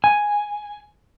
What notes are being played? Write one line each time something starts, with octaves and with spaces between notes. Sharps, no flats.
G#5